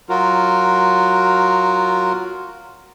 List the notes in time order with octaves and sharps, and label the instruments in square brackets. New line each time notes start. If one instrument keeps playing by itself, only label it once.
[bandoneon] F#3 F4 F#4 A#4